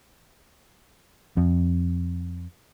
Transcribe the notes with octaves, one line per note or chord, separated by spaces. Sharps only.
F2